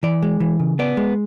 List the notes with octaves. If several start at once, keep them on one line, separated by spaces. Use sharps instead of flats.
E3 D5
G#3
E3
C#3
B3 D5
G#3